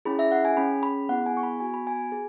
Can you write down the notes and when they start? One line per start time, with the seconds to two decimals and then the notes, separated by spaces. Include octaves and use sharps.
0.05 C#4 E4 G#4 B5
0.19 E5
0.32 F#5
0.45 G#5
0.57 C#4 G#4 B5
0.83 B5
1.09 B3 E4 G#4 F#5
1.26 G#5
1.37 C#6
1.43 B5
1.60 B3 F#4 G#5
1.74 B5
1.87 G#5
2.12 G#4